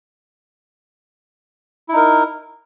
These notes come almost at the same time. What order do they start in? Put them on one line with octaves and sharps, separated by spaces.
E4 D#4 A#4